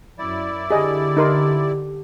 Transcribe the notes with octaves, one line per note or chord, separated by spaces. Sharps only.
F#2 E4 D5
D3 G4 G#4 D#5
D#4 A#4 C6